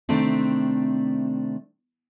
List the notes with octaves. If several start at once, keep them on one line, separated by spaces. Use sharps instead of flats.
C3 D#3 A3 C4 D4